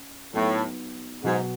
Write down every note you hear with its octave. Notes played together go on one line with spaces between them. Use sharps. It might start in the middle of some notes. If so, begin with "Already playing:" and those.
Already playing: C#4
A2 F#3 B3 D#4
G#2 B2 F#3 B3 F#4